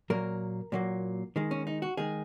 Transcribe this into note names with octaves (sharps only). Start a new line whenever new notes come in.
A#2 F#3 A#3 A#4
A#2 F#3 A#3
D#3 G#3
C#4
D#4
F#4
D#3 G#3 G#4